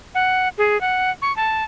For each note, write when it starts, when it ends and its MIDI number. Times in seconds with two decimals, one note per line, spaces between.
0.15 0.49 78
0.58 0.80 68
0.81 1.11 78
1.22 1.35 85
1.36 1.64 81